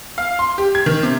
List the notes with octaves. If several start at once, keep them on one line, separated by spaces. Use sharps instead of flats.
F5
C6
G4
G#6
D#3
C3